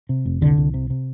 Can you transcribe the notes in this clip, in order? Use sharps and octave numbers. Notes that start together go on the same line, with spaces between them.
C3
F1
C2 D3
C2
C3
C3